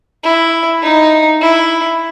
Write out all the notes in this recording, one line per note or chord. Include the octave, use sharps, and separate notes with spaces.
E4
D#4
E4